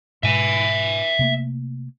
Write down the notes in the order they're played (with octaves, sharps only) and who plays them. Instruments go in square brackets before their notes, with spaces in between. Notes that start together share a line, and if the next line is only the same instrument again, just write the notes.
[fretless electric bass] G#2 B2 G#3 [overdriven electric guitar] E5 G#5
[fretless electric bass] C3 A3 A#3